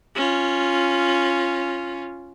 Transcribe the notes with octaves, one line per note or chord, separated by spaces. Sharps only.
C#4 F4